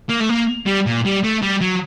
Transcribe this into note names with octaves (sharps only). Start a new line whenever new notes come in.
A#3
A3
A#3
G3
A#2
G3
A3
G3
F#3